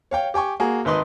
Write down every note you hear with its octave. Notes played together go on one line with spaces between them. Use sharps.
C#5 F5 G5
G4 G5 G#5 C#6
A#3 F#4 G#4 G#5
G#1 D#3 B4 D#5 C6 D#6